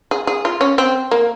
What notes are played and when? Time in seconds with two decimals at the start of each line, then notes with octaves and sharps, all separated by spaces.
0.11 G#4
0.27 G#4
0.45 F4
0.61 C#4
0.78 C4
1.11 A#3